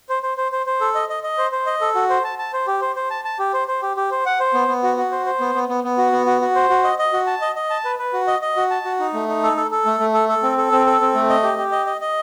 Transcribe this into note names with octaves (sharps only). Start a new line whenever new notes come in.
C5
C5
C5
C5
C5
A4
D#5
D#5
D#5
C5
C5
D#5
A4
F#4
C5
A5
A5
C5
G4
C5
C5
A5
A5
G4
C5
C5
G4
G4
C5
F#5
C5
B3
B3
F#4
F#4
C5
C5
B3
B3
B3
B3
F#4
B3
F#4
F#4
C5
F#4
D#5
D#5
F#4
A5
D#5
D#5
A5
B4
B4
F#4
D#5
D#5
F#4
A5
F#4
D#4
A3
D#4
A4
A4
A4
A3
A3
A4
A4
C4
A4
C4
A4
C4
A3
D#5
G4
G4
D#5
D#5
D#5